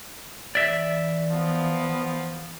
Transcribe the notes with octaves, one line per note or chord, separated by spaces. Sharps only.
E3 D5 E5
F3 B3